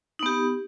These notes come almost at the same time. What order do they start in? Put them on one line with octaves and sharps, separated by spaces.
D#4 B3 G4